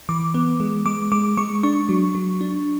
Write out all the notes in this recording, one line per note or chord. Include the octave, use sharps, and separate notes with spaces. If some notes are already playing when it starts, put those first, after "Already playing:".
E3 D6
B3
G#3
G#3 D6
G#3 D6
G#3 C#6
D4 C#6
F#3
F#3
D4